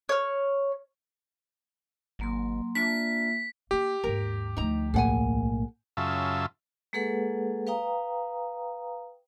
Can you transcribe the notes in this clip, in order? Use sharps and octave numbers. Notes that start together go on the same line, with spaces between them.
C#5 F6
G#1 F#3 A#3 C6
A#3 D4 F4 E5 B6
A#3 D4 G4
D#2 G#2 A#4
D2 F3 D#4 A#5
B1 A2 A#3 G#4 F#5 G#5
F#2 C#3 F4 E5 A5
G#3 A#3 G#4 A4 B4 F#5
B4 F5 G5 A#5 D#6